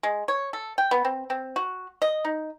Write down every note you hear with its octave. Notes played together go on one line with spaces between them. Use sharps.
G#3
C#5
A4
G5
B3
C4
C4
F#4
D#5
D#4